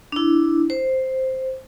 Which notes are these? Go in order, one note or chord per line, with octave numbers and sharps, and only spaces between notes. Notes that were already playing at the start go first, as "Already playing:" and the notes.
D4 E4
C5